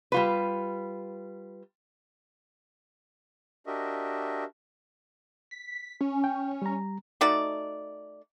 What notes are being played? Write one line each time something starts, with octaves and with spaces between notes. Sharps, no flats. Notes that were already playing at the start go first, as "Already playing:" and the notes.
G3 F4 B4
D4 F#4 G4 A#4 D#5 E5
B6
C#4
G5
G3 A#5
A3 D#4 F#4 D5